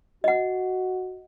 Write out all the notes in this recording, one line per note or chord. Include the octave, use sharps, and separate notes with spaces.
F#4 D#5 F#5